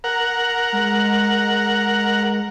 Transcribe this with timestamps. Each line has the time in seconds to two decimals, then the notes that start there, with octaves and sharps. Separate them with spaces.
0.04 A#4 F#5
0.73 G#3